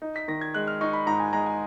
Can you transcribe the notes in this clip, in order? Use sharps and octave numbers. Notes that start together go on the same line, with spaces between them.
D#4
B6
D#3 A#6
G#6
G#3 F#6
F6
D#4 C#6
B5
G#2 A#5
G#5
G#3 A#5
G#5